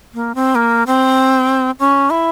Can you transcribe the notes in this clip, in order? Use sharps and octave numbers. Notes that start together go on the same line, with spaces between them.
A#3
C4
A#3
C4
C#4
E4